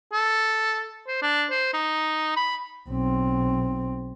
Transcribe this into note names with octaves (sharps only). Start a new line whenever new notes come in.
A4
C5
D4
C5
D#4
B5
B1 C4